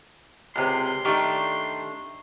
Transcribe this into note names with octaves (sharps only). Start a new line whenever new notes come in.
C#2 C3 C6
D#3 A3 D4 G4 C#6